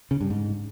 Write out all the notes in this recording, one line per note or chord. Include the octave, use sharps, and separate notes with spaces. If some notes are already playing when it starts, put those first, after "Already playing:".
C#3
G2
G#2